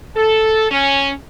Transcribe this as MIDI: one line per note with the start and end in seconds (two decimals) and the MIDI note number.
0.16 0.69 69
0.71 1.10 61